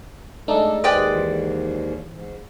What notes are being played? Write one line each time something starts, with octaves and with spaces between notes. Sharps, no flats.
G#3 A3 D4 D#4 A4
D#2 G#2 G#4 B4 C5 D5 D#5 G5
E3
G#2